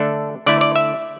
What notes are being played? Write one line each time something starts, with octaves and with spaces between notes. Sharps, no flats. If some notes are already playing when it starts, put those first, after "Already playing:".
Already playing: D3 A3 D4 A4
D3 A3 E4 D5
D5
E5